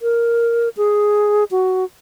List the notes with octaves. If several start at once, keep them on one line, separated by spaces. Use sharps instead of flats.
A#4
G#4
F#4